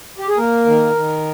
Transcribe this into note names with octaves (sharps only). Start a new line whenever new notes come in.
G4
G#4
A#3 A#4
D#3
D#3